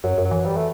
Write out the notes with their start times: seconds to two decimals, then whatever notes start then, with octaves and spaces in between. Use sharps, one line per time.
0.04 F#2 F#3
0.18 F#2
0.25 F#3
0.31 E3
0.45 G3
0.56 A3